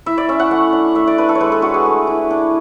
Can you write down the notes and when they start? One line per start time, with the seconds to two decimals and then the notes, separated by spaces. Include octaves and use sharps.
0.06 E4 E5
0.18 D5
0.29 C#4 E5
0.39 F#5
0.51 A3 F#5
0.73 D4
0.95 A3 E5
1.07 D5
1.18 D4 B4
1.29 A4
1.35 C#5
1.40 G#3 B4
1.52 A4
1.62 D4 F#4
1.74 G#4
1.86 A3
2.07 E4
2.30 D4